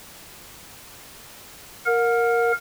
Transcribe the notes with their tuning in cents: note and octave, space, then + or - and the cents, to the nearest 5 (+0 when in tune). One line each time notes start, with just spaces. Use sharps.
A#4 +0 F#5 -40